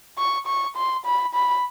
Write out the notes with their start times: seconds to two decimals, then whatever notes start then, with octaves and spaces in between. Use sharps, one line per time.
0.18 C#6
0.47 C#6
0.77 C6
1.06 B5
1.35 B5